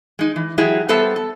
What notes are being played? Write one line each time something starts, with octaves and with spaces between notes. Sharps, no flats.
G#3 D#4
E3
F#3 G#3 E4 G4 G#4
G3 B3 A4 C5 E5
A4